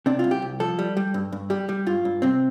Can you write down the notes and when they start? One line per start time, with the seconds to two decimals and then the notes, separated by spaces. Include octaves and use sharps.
0.06 C3 D4
0.19 C2 F4
0.31 G4
0.42 C2
0.60 F3 A4
0.79 G3
0.97 G3
1.14 G2
1.32 G2
1.50 G3 G4
1.69 G3
1.86 G2 F4
2.05 G2
2.22 C3 C4